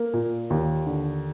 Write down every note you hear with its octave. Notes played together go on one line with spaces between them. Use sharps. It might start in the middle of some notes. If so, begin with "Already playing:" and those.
Already playing: A#3
A#2
D#2
D3